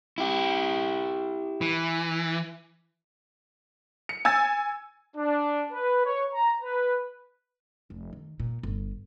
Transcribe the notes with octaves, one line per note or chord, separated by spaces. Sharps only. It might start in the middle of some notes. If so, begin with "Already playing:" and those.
E4 G4
E3
C#7
G#5 E6 G#6 A6
D4
B4
C#5
A#5
B4
F1
D#3
A#2
G1